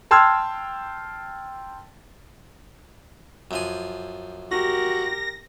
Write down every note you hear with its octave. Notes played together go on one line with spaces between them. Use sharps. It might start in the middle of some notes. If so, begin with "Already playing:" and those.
G5 A5 C6 E6 F6 G#6
F#2 F3 G#5
F#4 G4 A#4 A#6